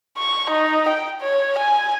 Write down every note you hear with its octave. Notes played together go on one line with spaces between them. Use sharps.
C#6
D#4
G5
C#5
G#5